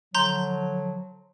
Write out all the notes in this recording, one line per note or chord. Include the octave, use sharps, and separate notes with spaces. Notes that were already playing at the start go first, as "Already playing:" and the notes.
D3 F3 F#3 A#5 C6 G6